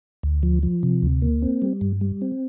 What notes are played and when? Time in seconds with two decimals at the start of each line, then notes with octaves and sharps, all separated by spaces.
0.23 D2
0.43 F3
0.63 F3
0.83 C3
1.03 D2
1.22 A#3
1.42 C4
1.62 G3
1.81 G2
2.01 G3
2.22 C4